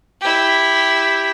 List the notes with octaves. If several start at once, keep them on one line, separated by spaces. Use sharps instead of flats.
E4 G4